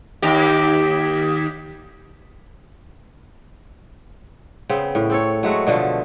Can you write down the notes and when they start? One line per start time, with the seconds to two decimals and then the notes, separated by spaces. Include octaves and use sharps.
0.22 D#2 G4
4.70 C#3 B3 C4
4.95 A2
5.10 C4 A4 C#5
5.43 F#3 G#3 A3 F#4
5.67 B2 D3 F3 A3